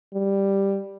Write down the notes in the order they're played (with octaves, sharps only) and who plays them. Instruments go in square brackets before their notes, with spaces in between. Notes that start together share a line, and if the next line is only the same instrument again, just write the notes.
[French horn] G3